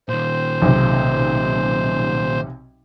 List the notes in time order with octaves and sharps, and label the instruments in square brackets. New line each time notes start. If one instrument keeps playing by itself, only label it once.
[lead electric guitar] A#2 D#3 [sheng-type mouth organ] C5
[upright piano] B1 C3